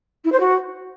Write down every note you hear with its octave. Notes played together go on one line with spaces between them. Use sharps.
E4
C5
F#4